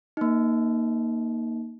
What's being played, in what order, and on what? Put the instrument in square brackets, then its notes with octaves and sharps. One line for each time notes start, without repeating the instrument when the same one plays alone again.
[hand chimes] A#3 D#4